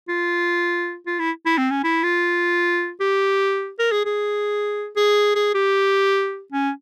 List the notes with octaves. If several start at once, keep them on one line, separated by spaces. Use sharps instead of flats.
F4
F4
E4
E4
C4
C#4
E4
F4
G4
A#4
G#4
G#4
G#4
G#4
G4
C#4